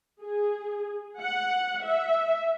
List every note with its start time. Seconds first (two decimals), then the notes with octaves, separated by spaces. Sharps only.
0.21 G#4
1.21 F#5
1.83 E5